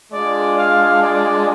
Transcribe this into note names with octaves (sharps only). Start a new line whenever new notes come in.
G#3 D4 F4 D5
F5
D5